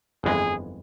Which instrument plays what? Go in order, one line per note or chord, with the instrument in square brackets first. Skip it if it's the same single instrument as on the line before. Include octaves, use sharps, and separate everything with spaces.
[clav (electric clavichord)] G1 F2 E3 G#3 [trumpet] G#4